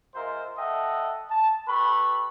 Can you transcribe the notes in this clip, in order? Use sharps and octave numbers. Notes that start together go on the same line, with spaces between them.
G#3 F4 A#4 C5 E5
A4 D#5 E5 F#5 G5 A5
A5
G4 A4 B4 B5 C#6